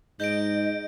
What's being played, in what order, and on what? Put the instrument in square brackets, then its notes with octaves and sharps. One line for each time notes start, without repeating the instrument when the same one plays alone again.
[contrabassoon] G#2 [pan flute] D#5 [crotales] G6 D7